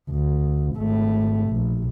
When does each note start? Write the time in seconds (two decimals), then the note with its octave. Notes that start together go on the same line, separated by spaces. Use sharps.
0.10 D2
0.76 G#1 A3
1.50 A#1